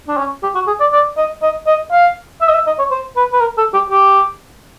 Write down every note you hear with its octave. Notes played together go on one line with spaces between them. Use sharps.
D4
C#4
G4
F#4
G#4
D5
D5
D#5
D#5
D#5
F5
E5
D#5
E5
D#5
C#5
C5
B4
B4
A#4
A4
G4
G4